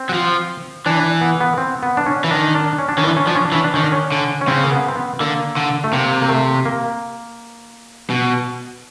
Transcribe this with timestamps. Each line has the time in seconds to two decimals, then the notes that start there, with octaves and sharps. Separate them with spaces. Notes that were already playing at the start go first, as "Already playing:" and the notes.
Already playing: C4
0.09 F#3
0.13 F3
0.86 E3 D4
1.21 B3
1.41 B3
1.58 C4
1.83 B3
1.97 D4
2.06 C#4
2.24 E3
2.31 D#3 D4
2.55 D4
2.78 C#4
2.89 D4
2.97 D#3 C#4
3.03 E3
3.07 D4
3.16 C#4
3.27 F3 D4
3.35 C#4
3.45 D4
3.52 E3
3.55 C#4
3.64 D4
3.74 D#3 C#4
3.83 D4
3.92 C#4
4.12 D3
4.41 C#4
4.48 C#3 C4
4.64 A#3
4.72 B3
4.88 C4
4.96 B3
5.20 D3 A#3
5.57 D3
5.84 A3
5.92 C3 A#3
6.22 A#3
6.29 A3
6.65 A#3
8.10 B2